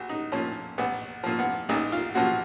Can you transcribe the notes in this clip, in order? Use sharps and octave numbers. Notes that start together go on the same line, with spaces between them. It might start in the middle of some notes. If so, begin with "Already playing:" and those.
Already playing: A#1 F#4
D#4
A#2 F3 C#4
A#1 B3
A#2 F3
B3
A#1 D#4
F4
A#2 F3 F#4